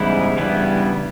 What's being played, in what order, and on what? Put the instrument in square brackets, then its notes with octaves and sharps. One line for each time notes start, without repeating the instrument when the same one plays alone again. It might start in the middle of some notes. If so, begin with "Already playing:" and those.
Already playing: [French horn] G#2 [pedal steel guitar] C#3 E3 G3 B3 E4
[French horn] G2 [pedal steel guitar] C#3 E3 G3 B3 E4